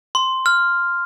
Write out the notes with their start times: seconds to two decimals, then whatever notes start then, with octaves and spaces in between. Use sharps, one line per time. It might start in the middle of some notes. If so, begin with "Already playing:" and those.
0.15 C6
0.46 F6